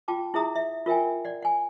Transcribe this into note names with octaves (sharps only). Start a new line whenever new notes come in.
F4 G5 A5 D6
E4 F4 G#4 E5 A#5 D#6
E5
F4 A#4 E5 G5 G#5
D5 F#5
F#5 G#5